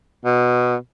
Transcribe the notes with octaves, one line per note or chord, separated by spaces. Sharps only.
B2